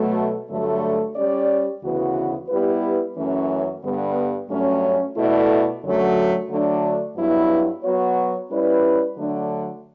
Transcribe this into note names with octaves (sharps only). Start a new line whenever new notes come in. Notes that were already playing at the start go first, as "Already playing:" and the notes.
Already playing: B2 F#3 A3
G2 D3 F#3 A3
G3 C#4 G4 D5
D2 C#3 E3 B3 F#4
G3 B3 E4 G4 B4
F#2 E3 A3 C#4
G2 D3 G3 B3
G2 F#3 A3 C#4
B2 A3 E4 A4 D5
F#2 D3 F#3 A3
D3 F#3 A3 D4
G2 F#3 B3 E4
F#3 B3 F#4 C#5
G3 C#4 E4 B4 D5
D3 F#3 A3 D4